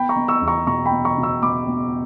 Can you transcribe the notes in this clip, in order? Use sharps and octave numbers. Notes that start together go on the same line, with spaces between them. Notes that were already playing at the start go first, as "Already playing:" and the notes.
Already playing: B3 G5 B5
A#5 C#6
B3
C#6 E6
E2
A#5 C#6
B2 A#5 C#6
G5 B5
B3
A#5 C#6
B2
C#6 E6
B3 B5 D6
B3